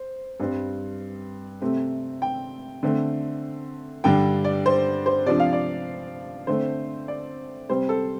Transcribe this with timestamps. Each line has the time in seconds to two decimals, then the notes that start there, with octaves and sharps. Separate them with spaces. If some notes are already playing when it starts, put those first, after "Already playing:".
Already playing: C5
0.40 G2 G3 C4
1.61 C3 A3 C4
2.22 G5
2.83 D3 A3 C4
4.04 G2 D3 G3 D4 G5
4.45 D5
4.66 C5
5.06 C5
5.26 C3 F3 D4 D5
5.40 F5
5.53 D5
6.47 D3 A3 C4 C5
7.08 D5
7.69 C3 G3 C4 C5
7.89 A4